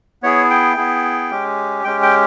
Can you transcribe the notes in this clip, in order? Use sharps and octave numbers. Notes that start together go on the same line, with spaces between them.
B3 E4 G#4 C#5
G5
B3 E4 G#4
G#3 C#4 G4
G#3 C#4 G4 G5
G5